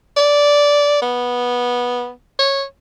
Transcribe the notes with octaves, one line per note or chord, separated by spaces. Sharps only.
D5
B3
C#5